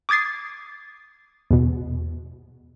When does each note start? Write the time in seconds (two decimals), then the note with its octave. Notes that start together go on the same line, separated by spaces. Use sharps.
0.09 D6 D#6 G#6 A6 C7
1.51 E2 B2